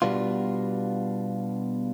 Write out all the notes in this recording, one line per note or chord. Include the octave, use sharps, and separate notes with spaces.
B2 G3 B3 D4 F4